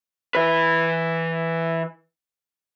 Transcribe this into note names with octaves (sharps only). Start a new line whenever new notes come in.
E3 B4